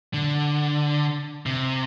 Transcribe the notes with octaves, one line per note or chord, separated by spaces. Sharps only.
D3
C3